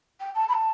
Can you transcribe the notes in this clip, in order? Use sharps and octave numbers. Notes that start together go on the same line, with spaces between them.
G5
A5
B5
A5